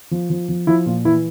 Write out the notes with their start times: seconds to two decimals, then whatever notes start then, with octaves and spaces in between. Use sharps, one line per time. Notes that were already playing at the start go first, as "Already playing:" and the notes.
0.11 F3
0.30 F3
0.49 F3
0.67 F3 E4
0.86 A#2 F4
1.05 E3 E4